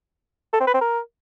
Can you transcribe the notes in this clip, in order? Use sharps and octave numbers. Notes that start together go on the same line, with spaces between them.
A4
C4
B4
C4
A#4